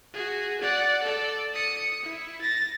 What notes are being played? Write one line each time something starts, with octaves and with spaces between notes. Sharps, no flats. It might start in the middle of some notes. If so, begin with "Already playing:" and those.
F#4 G#4
D5 F#5
A4 D5
D#6 C#7
E4
A6 A#6